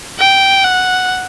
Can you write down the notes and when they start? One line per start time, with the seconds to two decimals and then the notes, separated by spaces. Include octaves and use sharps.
0.19 G5
0.64 F#5